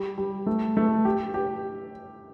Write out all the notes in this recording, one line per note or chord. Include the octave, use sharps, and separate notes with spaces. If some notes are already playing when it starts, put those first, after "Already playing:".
Already playing: G3
G3
A3
A3
G4
G4